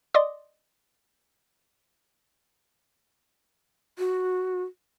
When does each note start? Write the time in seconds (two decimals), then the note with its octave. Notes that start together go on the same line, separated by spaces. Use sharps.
0.14 D5 D#5 C6 D6 D#6
3.99 F#4